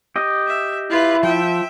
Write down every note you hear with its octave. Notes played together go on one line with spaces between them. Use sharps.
G4 D#5
E5
E4 F4 B4
F3 E5 G5